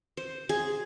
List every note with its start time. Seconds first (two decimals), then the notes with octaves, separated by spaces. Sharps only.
0.17 C5
0.49 G#4